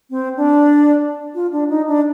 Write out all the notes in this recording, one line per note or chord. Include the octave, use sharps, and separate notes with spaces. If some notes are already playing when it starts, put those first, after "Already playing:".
C4
D4
F4
D4
D#4
D4